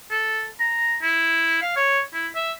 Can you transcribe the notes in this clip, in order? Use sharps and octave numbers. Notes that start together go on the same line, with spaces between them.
A4
A#5
E4
F5
C#5
E4
E5